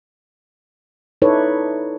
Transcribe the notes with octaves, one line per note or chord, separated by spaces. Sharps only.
D#4 E4 A4 B4 C#5 D5